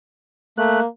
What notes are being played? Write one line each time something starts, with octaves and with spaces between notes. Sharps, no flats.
A3 A#3 F#6